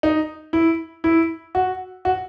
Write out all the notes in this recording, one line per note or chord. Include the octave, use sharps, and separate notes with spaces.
D#4
E4
E4
F#4
F#4